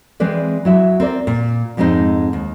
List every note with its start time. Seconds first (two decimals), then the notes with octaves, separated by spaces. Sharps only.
0.20 E3 G#3 C4 B4 D5
0.65 F#3 E4 E5
1.00 C4 A#4 D5
1.27 A#2
1.77 F2 G#2 G#3 C4 D#4
2.33 D#2